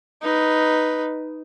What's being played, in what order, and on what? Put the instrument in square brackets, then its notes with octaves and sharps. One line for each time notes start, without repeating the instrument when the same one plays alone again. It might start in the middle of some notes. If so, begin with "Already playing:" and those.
[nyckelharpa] D#4 B4